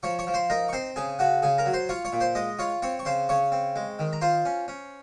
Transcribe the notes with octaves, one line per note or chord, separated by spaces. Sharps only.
F3 C#5 C#6
C#5 C#6
F3
C5 C6
D#4 A#4 A#5
C#6
C4 C5 C6
C#3 G#4 G#5
C#3 F#4 F#5
C#3 G#4 G#5
A#4 A#5
F#3
C5 C6
F4 C#5 C#6
C#5 C#6
A#2
C5 C6
G#3 D#5 D#6
F4 C#5 C#6
C4 C#5 C#6
C#6
C#3 C5 C6
C#3 C#5 C#6
C4
G#3
D#3
A#5
F4 C5 C6
C#4
C#4